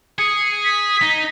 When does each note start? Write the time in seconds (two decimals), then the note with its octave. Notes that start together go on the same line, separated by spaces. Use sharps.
0.18 G#4 C#7
0.64 B6
1.02 D#4